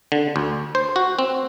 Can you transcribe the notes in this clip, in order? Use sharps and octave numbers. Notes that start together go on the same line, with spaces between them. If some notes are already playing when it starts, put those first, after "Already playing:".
D3
D2
C5
F#4
C4